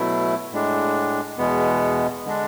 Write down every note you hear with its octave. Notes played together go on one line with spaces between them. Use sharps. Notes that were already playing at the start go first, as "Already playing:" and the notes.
Already playing: B2 F#3 A3 E4
A2 G#3 D4
E2 B2 G#3 B3
D3 G#3 D4